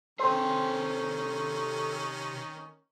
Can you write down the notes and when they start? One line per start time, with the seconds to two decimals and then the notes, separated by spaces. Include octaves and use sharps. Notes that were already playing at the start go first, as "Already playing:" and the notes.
0.19 C3 D#3 C4 C#4 G#4 A4 C5